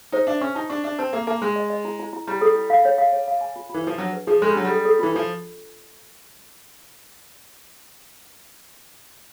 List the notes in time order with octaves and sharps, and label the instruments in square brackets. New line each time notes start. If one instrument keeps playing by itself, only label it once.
[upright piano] D#4 [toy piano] C5
[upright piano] D4 [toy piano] E5
[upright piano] C#4 [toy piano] C#6
[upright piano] D#4 [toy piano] A5
[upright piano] D4 [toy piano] C#6
[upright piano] D4 [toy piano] E5
[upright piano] C4 [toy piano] A5
[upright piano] A#3 [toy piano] A#4
[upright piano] A#3 [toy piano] A5
[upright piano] G#3 [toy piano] A#4
[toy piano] D#5
D#5
E4
E4
E4
[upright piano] G3 [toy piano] E4
[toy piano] A4
E4
F5
C#5
F5
C#5
F5
G#5
F4
[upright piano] E3 [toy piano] F4
[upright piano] F3 [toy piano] B4
[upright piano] F#3 [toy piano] D4
[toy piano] B4
[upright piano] F3 [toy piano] G#4
[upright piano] G#3 [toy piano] A4
[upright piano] G3
[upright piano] F#3 [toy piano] D4
[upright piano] G3
[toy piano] A4
A4
[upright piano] E3 [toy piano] F4
[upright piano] F3 [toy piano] F4